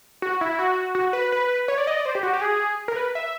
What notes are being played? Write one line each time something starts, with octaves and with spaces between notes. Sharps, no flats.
F#4
E4
F#4
F#4
B4
B4
C#5
D5
D#5
D5
C5
G4
F#4
G4
G#4
A#4
B4
E5